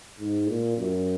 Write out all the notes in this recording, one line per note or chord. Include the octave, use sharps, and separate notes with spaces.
G#2
A#2
F#2